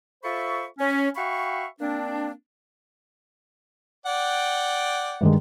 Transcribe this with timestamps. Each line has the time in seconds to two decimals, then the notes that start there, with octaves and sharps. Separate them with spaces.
0.23 F4 A4 C5 E5 B5 C#6
0.79 C#4
1.15 F#4 E5 F5 G5 B5 C#6
1.80 A#3 C4 D4
4.06 D5 F#5 G5
5.21 G2 D#3 G#3